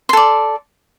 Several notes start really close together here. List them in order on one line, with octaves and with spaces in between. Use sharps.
C6 A4 D5